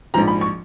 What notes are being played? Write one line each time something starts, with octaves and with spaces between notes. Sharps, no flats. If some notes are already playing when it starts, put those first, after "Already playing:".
A#1 G#2 F3 A#5
B5
C#6